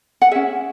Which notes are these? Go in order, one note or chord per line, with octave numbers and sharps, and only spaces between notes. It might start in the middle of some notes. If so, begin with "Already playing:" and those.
F#5
C#4 G#4 E5